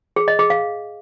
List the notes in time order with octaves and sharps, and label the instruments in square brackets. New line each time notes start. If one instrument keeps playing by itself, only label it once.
[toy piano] G#4
D#5
G#4
F5